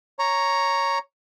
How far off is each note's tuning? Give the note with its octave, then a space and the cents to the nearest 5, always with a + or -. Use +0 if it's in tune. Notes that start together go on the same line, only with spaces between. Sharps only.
C#5 +0 A#5 +0